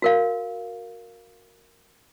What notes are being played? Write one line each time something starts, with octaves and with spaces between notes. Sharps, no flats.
F#4 A#4 F5